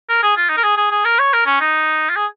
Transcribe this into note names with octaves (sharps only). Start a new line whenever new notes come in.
A#4
G#4
F4
D#4
A#4
G#4
G#4
G#4
A#4
C#5
A#4
C#4
D#4
F4
G#4